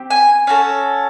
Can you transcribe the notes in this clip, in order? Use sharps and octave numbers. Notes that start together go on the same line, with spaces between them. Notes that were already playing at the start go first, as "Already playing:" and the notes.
Already playing: C4 G4
G#5
C#4 F#4 A4